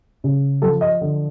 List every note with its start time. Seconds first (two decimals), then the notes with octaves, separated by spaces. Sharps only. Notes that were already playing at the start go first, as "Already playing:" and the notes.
0.24 C#3
0.62 F3 A4
0.81 D#5
1.01 D3